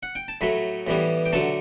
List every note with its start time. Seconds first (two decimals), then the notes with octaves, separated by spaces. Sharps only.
0.03 F#5
0.16 G5
0.28 A5
0.41 A2 F#3 A3 B5
0.87 A2 E3 G3 B3
1.26 G5
1.33 D3 F#3 A3 A5